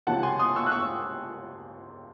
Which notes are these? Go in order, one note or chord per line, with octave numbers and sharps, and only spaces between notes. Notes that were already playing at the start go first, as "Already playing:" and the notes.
C#2 C3 D#3 F#3 F#5 A5
G#5 C6
C6 D#6
C#6 E6
F#6
C#6 E6